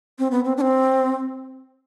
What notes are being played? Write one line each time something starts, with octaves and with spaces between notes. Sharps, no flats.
C4
B3
C4
D4
C4